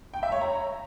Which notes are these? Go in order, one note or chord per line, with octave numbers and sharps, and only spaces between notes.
G5
E5
C#5
A#5